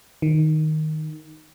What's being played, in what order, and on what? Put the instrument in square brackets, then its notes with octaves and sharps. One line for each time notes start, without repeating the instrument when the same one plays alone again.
[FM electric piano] D#3